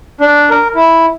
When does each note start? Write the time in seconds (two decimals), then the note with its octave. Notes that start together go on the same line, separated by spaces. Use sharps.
0.21 D4
0.50 A#4
0.75 E4